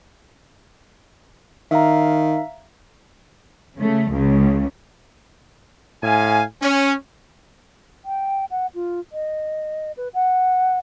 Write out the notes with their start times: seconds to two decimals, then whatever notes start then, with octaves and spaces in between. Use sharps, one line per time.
1.71 D#3 E5 F5 A#5
3.78 C#3 A3
4.10 C#2 C#3
6.03 A2 F5 G#5
6.62 C#4
8.05 G5
8.51 F#5
8.75 F4
9.12 D#5
9.97 B4
10.14 F#5